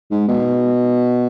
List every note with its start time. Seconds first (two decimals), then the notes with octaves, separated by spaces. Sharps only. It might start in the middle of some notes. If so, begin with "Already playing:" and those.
0.11 G#2
0.28 B2